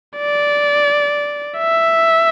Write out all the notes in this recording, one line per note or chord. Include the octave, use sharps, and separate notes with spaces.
D5
E5